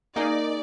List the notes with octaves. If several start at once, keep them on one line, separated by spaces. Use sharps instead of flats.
A#3 D#4 G#4 D5 D#5